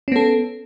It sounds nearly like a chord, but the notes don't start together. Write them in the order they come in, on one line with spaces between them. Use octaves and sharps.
C#4 B3 A4